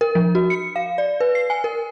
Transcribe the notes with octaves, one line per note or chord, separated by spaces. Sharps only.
A#4
F3
F#4
C#7
F5
D5
B4
C7
G#5
A#4